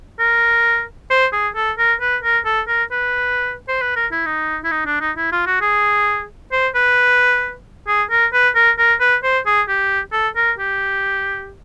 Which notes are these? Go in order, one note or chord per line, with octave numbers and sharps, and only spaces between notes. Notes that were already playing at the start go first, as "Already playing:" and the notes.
A#4
C5
G#4
A4
A#4
B4
A#4
A4
A#4
B4
C5
B4
A#4
E4
D#4
E4
D#4
D4
D#4
E4
F4
F#4
G#4
C5
B4
G#4
A#4
B4
A#4
A#4
B4
C5
G#4
G4
A4
A#4
G4